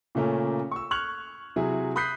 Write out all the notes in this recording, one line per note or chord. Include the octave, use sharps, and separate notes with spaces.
A#2 C#3 A3 A#3 C#4
C#6 E6
C#6 F6 F#6 G#6 F7 F#7
C3 F#3 E4 G#4
B5 D#6 F#6 G6 B6 C7